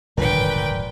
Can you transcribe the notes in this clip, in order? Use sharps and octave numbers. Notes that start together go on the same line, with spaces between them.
D#1 G#1 G2 A#2 D3 F3 B4 G5